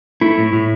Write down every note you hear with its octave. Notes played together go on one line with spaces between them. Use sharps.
A3 E4
A2
A2